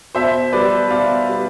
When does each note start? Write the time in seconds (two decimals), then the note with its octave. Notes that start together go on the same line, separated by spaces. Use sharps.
0.15 B2 C5 E5
0.53 G3 B3 B4 D5
0.90 B2 D5 F5
1.29 G3 B3